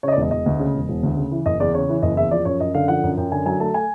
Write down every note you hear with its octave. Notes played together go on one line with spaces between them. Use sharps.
C#3 C#5 D#5
D5
E1 D#5
E1 D#5
D2
C#3
E1
E1
D2
C#3
E3
F#1 D#5
E2 D5
C#3 C#5
E3
F#1 D#5
E2 E5
F3 D5
F#2 C#5
F#2 D#5
D3 F5
F3 F#5
F#2
F#2 G5
D3 G#5
F#3 G#5
A3 A5
G#5